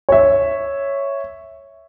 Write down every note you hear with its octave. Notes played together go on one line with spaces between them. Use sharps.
C#5 E5